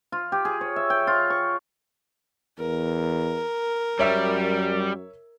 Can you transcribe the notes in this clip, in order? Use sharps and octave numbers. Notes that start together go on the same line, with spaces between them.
F4
G4
G#4
C#5
E5
G5
F4
C#6
E2 A#4
F#2 G3 C#5 E5 E6